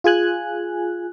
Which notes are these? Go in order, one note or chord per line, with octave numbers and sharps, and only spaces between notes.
F4 G#4 G#5 F#6